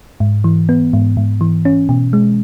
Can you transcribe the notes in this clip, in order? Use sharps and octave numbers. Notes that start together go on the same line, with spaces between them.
G#2
E3
B3
G#2
G#2
E3
C#4
B2
G#3